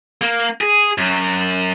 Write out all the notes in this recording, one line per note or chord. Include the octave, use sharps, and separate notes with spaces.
A#3
G#4
F#2 F#3